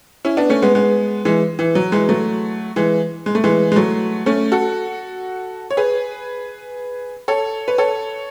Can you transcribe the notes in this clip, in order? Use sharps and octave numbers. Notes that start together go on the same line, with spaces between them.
C#4 E4
B3 D4
A3 C#4
G#3 B3
G#3 B3
E3 G#3
E3
F#3
E3 G#3
F#3 A3
E3 G#3
G#3
A3
E3 G#3
G#3
F#3 A3
A3 C#4
F#4 A4
C#5
G#4 B4
A4 C#5
B4
A4 C#5